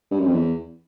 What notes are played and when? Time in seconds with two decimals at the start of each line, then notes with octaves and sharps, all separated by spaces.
0.11 G2
0.19 F#2
0.26 F2
0.33 E2